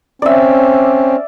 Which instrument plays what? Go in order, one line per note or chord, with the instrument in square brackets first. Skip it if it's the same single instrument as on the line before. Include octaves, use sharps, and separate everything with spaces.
[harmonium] C4 C#4 [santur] D5 E5